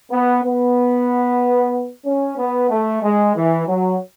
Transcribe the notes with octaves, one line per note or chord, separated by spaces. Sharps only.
B3
B3
C#4
B3
A3
G#3
E3
F#3